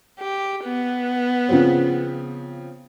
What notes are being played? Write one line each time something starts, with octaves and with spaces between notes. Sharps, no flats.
G4
B3
C#3 F3 C4